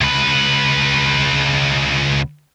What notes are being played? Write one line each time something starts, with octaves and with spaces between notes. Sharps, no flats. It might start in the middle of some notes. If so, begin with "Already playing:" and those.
C#2 B4